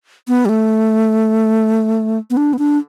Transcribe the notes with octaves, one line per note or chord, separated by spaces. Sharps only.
B3
G3
A3
B3
D4
B3
D4